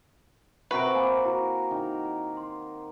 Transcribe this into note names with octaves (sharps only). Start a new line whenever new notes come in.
C3 F#4 A#4 B4 C#6 D7
A#3 G#5
E4 F#4 A#5
D#3
C6